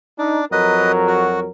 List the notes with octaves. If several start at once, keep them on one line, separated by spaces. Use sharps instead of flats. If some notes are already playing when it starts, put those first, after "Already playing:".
D4 D#4
F2 F#3 A#4 B4 D#5
F#4